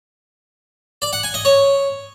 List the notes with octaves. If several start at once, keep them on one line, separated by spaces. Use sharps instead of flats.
D5
F#5
G#5
D#5
C#5